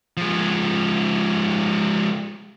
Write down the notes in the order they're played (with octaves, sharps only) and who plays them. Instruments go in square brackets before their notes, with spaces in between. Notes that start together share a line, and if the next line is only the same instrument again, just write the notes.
[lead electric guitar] F3 G#3